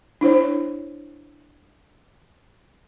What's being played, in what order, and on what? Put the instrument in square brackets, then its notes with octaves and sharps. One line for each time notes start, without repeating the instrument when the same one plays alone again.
[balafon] D4 E4 C5 C#5